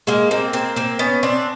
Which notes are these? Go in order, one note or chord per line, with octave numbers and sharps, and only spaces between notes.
G#3 A#3
A#3 C4
A#3 C4
A#3 C4
B3 C#4
C4 D4